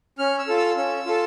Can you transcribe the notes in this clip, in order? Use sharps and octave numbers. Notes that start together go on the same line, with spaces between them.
C#4 F6
E6
F4 A4
E6
C#4 E6
F4 A4